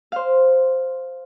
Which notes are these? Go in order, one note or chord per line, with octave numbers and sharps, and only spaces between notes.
C5 F5